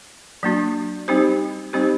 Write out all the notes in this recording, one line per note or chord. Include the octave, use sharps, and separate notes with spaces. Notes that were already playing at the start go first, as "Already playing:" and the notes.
F#3 A#3 D4 F#4
G3 C4 D#4 G4 C5
G3 C4 D#4 G4 C5